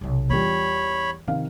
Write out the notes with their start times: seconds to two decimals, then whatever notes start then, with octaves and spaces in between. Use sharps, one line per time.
0.01 B1 C3
0.30 E2 G3 F4 C#5 B5
1.28 C3 D#3 F3 F5